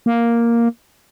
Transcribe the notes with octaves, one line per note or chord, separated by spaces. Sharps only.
A#3